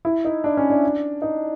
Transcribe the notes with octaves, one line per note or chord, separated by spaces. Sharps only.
E4
D#4
D4
C#4
D4
D#4